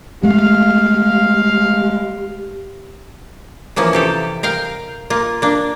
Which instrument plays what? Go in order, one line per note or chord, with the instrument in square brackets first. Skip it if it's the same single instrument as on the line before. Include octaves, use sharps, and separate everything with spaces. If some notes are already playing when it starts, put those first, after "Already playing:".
[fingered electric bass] G#3 A3 [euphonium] G4 [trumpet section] F5
[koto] E3 F3 A#3 C#4
C3 G4 A4
A#4 F5 G5
A#3 F4
A#3 D4